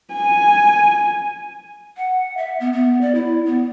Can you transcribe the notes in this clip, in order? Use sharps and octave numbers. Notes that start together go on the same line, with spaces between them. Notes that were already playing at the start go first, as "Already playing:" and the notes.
G#5
F#5
E5
B3
B3
D5
E4
B3